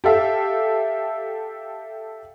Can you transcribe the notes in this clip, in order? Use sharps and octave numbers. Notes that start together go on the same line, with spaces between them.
G4 A4 E5 F5